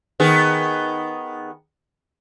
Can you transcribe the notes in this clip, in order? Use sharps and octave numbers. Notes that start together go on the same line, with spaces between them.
D#3 B3 G#4